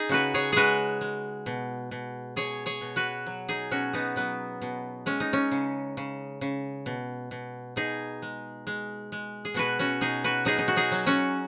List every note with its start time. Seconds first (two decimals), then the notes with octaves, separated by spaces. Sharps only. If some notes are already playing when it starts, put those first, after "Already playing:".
Already playing: D#4 G#4
0.09 C#3 F#4 B4
0.34 G#4 C#5
0.52 G#3 F#4 G#4 B4
1.01 G#3
1.46 B2
1.91 B2
2.36 B2 G#4 C#5
2.66 G#4 C#5
2.81 B2
2.96 F#4 B4
3.27 F#3
3.49 D#4 G#4
3.71 B2 C#4 F#4
3.93 B3 D#4
4.16 F#3 B3
4.62 B2
5.06 G#3 C#4
5.20 D#4
5.33 C#4
5.51 C#3
5.97 C#3
6.41 C#3
6.86 B2
7.31 B2
7.76 B2 D#4 G#4
8.22 G#3
8.67 G#3
9.12 G#3
9.45 G#4
9.54 B2 F#4 B4
9.79 C#4 F#4
10.01 B2 D#4 G#4
10.24 F#4 B4
10.45 F#3 D#4 G#4
10.59 D#4
10.68 F#4
10.76 D#4 G#4
10.91 F#3
11.07 C#4 F#4